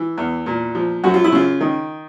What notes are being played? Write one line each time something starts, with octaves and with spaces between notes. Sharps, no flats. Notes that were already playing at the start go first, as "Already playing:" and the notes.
Already playing: E3
E2
A#2
F3
F#2 F#4
F4
E4
C#3 F4
D#3